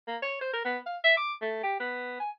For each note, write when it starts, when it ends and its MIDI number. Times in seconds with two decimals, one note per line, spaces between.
0.08 0.17 58
0.22 0.38 73
0.41 0.52 72
0.53 0.61 70
0.65 0.78 59
0.86 0.97 77
1.04 1.15 76
1.17 1.33 86
1.42 1.59 57
1.63 1.77 67
1.80 2.18 59
2.20 2.30 80